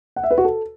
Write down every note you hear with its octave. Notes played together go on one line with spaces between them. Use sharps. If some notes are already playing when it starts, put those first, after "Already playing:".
F#5
E5
B4
F#4
A4